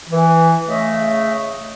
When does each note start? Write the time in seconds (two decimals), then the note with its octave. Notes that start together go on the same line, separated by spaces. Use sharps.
0.09 E3
0.68 C#3 A3 D#5 E5